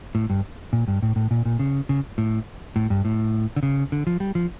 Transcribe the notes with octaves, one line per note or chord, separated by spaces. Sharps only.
A2
G2
A#2
G2
A2
A2
A#2
A#2
C#3
C#3
A2
A2
G2
A2
D3
C#3
D3
F3
G3
F3